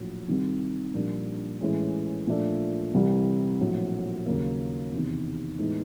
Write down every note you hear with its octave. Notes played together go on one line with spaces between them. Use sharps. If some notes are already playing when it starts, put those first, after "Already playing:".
Already playing: A#1 A2 F#3
C2 C3 D#3 G3
A#1 A#2 G3 A#3 D4
A2 E3 G#3 C#4
A#2 F3 A3 D4
C2 C3 E3 G3
A#1 A2 F#3
D#2 C#3 F#3 A#3
E2 C3 D#3
A2 E3 G#3 B3 D#4